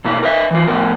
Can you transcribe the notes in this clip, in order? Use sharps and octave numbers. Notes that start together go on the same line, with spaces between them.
B2 A#3 E4
A#4 B4 D#5 E5
E3 F4
F2 A2 B3 A#4